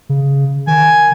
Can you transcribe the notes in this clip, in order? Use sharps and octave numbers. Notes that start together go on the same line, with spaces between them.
C#3
D#3 G#5